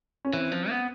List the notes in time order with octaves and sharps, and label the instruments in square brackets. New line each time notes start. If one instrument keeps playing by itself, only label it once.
[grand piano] C#4
[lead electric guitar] E3 [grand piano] C4
[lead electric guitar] F3
B3